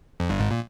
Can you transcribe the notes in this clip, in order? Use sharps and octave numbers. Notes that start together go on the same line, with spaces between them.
F2
G1 G2
G#1 G#2
A#2